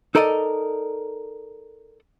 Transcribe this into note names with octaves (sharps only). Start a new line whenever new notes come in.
D#4 A4 A#4 D5 D#5